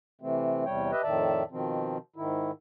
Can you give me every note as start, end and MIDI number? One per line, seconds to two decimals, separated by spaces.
0.21 0.65 48
0.21 0.65 52
0.21 0.65 57
0.21 0.65 60
0.65 0.91 40
0.65 0.91 48
0.65 0.91 55
0.65 0.91 73
0.65 0.91 79
0.91 1.02 67
0.91 1.02 71
0.91 1.02 75
0.91 1.02 76
1.03 1.43 41
1.03 1.43 45
1.03 1.43 51
1.03 1.43 74
1.03 1.43 76
1.03 1.43 81
1.51 1.98 47
1.51 1.98 51
1.51 1.98 53
1.51 1.98 60
2.16 2.51 44
2.16 2.51 51
2.16 2.51 64